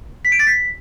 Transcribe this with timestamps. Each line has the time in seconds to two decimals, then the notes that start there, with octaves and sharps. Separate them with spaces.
0.25 B6
0.32 D7
0.39 A6
0.47 B6